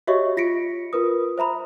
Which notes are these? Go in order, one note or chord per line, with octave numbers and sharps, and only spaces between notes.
F#4 G4 C#5 D#5 E5 C#6
F4 A#6 B6 C#7 D7
F4 A#4 B4 D#6
C5 E5 A#5 B5